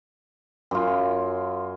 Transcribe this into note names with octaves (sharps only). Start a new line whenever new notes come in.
F#2 F4